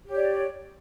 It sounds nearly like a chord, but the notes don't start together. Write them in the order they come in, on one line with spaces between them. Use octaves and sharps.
G4 C#5 D5